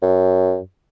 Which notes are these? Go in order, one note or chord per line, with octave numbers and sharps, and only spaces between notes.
F#2